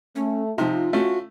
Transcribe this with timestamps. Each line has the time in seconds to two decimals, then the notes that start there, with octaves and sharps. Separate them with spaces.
0.16 A3 C#4
0.58 C3 F3 D#4 F4
0.93 A3 C#4 F#4